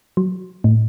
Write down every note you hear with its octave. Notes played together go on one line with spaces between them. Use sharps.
F#3
A2